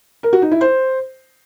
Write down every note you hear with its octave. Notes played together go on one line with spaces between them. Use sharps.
A#4
F#4
D#4
E4
C5